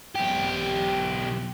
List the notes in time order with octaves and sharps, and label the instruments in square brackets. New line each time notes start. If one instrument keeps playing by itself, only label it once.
[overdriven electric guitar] B1 G4